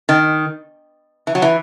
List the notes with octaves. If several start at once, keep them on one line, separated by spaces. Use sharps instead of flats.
D#3
E3
F#3
E3